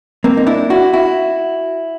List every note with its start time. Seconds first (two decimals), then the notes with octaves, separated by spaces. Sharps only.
0.24 A#3 C4
0.37 D#4
0.47 D4 E4
0.70 E4 F#4
0.93 E4 F#4